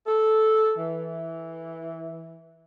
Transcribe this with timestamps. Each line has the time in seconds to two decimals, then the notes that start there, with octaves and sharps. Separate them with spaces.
0.07 A4
0.78 E3